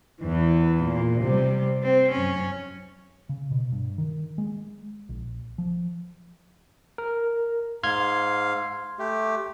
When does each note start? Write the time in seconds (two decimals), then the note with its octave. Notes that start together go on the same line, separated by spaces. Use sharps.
0.22 E2 E3
0.84 A#2
1.21 C3 G3
1.83 C4
2.12 F#2 C#4
3.29 C#3
3.51 B2
3.72 G2
3.98 D#3
4.38 G#3
5.09 A#1
5.58 F3
6.98 A#4
7.83 G#2 F5 C6 F6 G#6
8.99 A3 G4